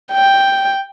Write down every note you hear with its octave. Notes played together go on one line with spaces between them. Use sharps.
G5